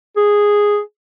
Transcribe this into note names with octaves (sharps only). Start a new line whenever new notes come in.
G#4